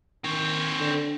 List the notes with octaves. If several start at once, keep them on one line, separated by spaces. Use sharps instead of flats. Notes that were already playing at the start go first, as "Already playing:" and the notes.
D#3 C4 C#5
D3